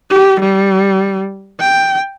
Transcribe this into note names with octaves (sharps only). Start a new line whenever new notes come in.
G4
G3
G5